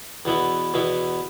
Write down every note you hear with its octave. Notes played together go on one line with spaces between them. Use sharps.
E2 B2 B3 E4
E2 B2 B3 E4